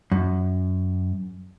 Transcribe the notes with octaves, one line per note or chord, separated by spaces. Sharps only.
F#2